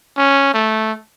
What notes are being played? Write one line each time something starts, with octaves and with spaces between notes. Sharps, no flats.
C#4
A3